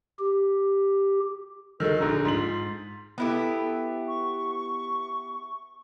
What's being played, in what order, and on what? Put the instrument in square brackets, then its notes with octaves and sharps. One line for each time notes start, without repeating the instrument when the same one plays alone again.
[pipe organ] G4
[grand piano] D#3 F#3 G#3 [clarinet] A4
[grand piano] A#1 D3 [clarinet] D#4
[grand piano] G#2 F#7 [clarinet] F4
[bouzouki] B3 E4 G4 [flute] A4
[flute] C#6